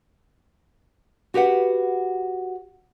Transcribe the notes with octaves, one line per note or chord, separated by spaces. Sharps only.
F#4 G4 B4 F#5